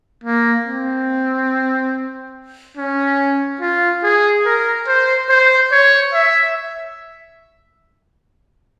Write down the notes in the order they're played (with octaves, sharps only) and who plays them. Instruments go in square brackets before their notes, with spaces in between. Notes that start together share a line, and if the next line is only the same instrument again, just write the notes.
[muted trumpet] A#3
C4
C#4
F4
G#4
A#4
C5
C5
C#5
E5